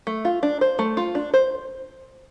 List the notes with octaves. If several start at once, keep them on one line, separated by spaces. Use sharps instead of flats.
A3
F4
D4
C5
A3
F4
D4
C5